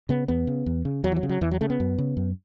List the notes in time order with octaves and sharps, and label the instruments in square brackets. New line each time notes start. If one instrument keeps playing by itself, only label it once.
[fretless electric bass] C#3 B3
E2 B3
C#3
E2
C#3
E2 F#3
E3
F#3
C#3
F#3
E2 E3
F#3
C#3 A3
B3
F#2
C#3
F#2